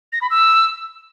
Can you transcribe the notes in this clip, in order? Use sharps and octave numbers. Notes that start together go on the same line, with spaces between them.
A#6
B5
E6